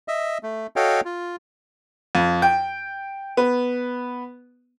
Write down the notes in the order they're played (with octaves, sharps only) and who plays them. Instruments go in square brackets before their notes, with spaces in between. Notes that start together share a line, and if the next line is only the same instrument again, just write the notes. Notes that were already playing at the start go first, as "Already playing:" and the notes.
[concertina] D#5 E5
A3
F#4 A4 C#5 D#5 F5 G5
F4
[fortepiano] F2
G5
B3